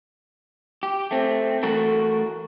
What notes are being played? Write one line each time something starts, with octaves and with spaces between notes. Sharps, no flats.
G4
A3 C4
E3 A3 F#4 A4 A#4